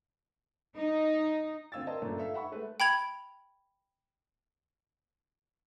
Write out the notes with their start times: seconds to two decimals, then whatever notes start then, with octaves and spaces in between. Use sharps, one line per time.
0.78 D#4
1.72 D2 C4 F4 E6 G#6 A6
1.87 A#4 C5 D5 D#5 G5 A5
2.01 G1 F#2 A#2 A3 D4 A#5
2.18 A4 E5 F5
2.33 G4 E5 F#5 B5 C#6
2.52 G#3 A3 B4 E5
2.80 G5 B5 G#6 F7